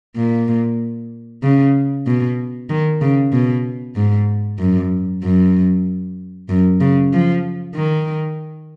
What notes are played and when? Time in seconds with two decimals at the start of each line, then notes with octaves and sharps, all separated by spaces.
0.16 A#2
1.43 C#3
2.07 B2
2.70 D#3
3.01 C#3
3.33 B2
3.96 G#2
4.59 F#2
5.23 F#2
6.49 F#2
6.81 C#3
7.12 F3
7.75 D#3